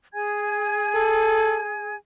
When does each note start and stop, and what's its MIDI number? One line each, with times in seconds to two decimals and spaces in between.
0.13 1.95 68
0.13 1.95 80
0.13 1.95 92
0.95 1.62 69